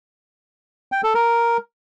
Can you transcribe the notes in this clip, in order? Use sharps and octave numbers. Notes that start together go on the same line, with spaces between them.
G5
A4
A#4